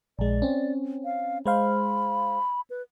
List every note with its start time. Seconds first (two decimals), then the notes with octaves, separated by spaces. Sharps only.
0.19 A#1 G#3 D5
0.42 C4 C#4
1.05 F5
1.46 G#3 C5 F5 B5
2.70 B4